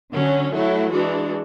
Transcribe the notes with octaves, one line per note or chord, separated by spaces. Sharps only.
D3 F#3 C#4
F#3 A3 E4
E3 G#3 D4 F#4